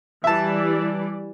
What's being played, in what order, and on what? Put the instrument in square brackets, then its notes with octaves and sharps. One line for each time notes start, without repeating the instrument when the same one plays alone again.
[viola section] E3 G3 D5 [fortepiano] E5 A5